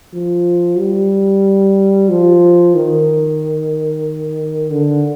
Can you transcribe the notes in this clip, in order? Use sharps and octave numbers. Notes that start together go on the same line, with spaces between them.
F3
G3
F3
D#3
D3